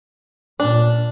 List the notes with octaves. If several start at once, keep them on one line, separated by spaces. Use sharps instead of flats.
A#2 D4